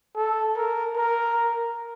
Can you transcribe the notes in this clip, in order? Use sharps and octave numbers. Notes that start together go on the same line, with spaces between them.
A4
A#4
A#4